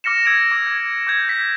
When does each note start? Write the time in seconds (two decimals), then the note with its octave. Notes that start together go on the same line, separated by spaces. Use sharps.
0.04 D6 F6 A#6 C#7 E7
0.25 E6 G#6 A#6 D7 F7
0.51 D6
0.67 G#6
1.07 D6 G6 G#6
1.29 G6 B6